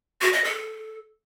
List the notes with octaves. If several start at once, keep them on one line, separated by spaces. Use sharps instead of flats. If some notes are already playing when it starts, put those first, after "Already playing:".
F#4
D#5
A4